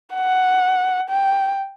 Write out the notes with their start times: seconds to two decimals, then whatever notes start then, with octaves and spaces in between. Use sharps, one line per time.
0.14 F#5
1.09 G5